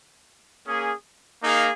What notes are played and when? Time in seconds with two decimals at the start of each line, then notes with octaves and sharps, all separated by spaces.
0.66 A#3 C#4 G#4
1.43 A#3 D#4 G#4 F5